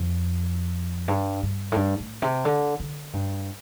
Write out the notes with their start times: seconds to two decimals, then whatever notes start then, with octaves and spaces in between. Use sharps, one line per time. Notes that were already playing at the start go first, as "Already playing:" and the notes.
Already playing: F2
1.08 G2
1.43 G2
1.72 A2
1.76 G2
2.00 A2
2.22 C3
2.45 D3
2.80 D3
3.13 G2